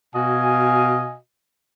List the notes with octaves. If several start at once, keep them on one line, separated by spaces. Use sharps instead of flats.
B2 F#4 D#5 F5 G#5